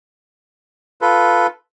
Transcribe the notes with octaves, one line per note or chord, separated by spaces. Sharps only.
F4 A4 B4